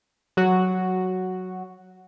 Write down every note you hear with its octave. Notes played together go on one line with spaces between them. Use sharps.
F#3 F#4